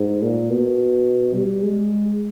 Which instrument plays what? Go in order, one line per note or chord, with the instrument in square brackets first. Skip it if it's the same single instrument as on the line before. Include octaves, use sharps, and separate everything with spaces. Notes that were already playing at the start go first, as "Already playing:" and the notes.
Already playing: [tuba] G#2
A#2
B2
G3
G#3